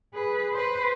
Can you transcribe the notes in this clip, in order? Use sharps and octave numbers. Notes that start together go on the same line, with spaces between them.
G#4 B4
B4 C5